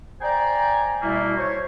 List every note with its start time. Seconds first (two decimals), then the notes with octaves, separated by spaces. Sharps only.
0.21 C5 D5 G5 G#5 A#5
1.01 B2 G3 A3 A#3 E4
1.36 C5 C#5